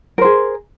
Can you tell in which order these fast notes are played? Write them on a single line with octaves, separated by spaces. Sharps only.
A#4 C5 G#4